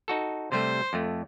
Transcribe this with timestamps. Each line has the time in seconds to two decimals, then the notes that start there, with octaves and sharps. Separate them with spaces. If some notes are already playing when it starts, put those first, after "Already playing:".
0.08 D#4 F#4 A4
0.52 C3 G3 A3 C5
0.93 F2 A3